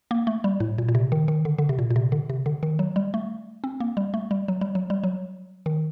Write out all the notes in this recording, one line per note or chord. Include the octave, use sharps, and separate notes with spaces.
A#3
A3
G3
A2
A#2
A#2
C3
D#3
D#3
D3
D3
C3
A#2
A#2
C3
D3
C3
D3
D#3
F#3
G3
A3
C4
A#3
G3
A3
G3
F#3
G3
F#3
G3
F#3
D#3